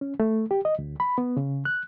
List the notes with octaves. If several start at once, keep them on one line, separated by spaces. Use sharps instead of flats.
C#4
A3
G4
D#5
D2
B5
B3
C#3
F#6